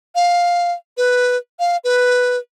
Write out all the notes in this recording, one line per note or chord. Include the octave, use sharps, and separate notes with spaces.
F5
B4
F5
B4